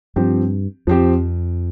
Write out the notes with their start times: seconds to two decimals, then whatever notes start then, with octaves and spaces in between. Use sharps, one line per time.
0.16 G2 F3 C4 G4
0.87 F2 F3 C4 G4